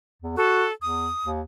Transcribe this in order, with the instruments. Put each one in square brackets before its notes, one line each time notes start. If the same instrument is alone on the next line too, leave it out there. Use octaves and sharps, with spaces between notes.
[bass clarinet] E2
[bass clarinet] F#4 [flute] A4
[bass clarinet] E2 [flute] D#6
[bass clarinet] D#2